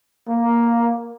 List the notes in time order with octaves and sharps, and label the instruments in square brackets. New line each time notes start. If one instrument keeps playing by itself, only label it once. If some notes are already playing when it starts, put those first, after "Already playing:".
[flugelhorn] A#3